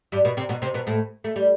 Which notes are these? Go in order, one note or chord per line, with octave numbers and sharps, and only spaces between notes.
G2 G3
B2 B3
C3 C4
B2 B3
C3 C4
B2 B3
A2 A3
A3
G3